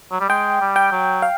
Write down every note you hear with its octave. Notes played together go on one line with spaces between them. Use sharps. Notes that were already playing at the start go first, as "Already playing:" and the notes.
F#3
G3
G#3 G5
G3
G5
F#3
F5